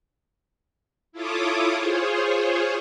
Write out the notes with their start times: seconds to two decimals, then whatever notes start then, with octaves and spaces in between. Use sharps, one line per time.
1.12 E4 F4 A4 C#5 D6 D#6
1.75 F4 G#4 C5 C#5